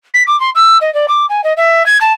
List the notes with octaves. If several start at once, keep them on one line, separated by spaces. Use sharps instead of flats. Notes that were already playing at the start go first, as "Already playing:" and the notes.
B6
D6
C6
E6
D#5
D5
D6
G#5
D#5
E5
G#6
A5